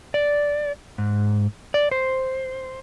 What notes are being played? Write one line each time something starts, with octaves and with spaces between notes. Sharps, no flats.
D5
G#2
D5
C5